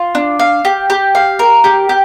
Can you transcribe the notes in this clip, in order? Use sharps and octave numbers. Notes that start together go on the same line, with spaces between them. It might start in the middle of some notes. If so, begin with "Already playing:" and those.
Already playing: F4
D4
F5
G4
G4
F5
A#4
G4
G4